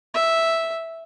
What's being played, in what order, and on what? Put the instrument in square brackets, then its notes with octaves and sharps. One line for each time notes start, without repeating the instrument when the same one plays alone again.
[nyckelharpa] E5